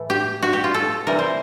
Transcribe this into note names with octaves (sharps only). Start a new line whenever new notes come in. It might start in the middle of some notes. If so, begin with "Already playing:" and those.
Already playing: A2 E3 A3
G4
F#4
G4
F4
A4
C3 E3 G3 A#4
C5